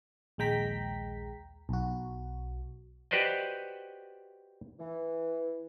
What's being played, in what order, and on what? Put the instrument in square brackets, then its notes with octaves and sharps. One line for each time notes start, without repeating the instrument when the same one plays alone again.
[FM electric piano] A#1 D#2 G#3 G5 A#5 B6
B1 F#4
[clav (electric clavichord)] F#4 G4 B4 C5 D5 D#5
[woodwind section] E3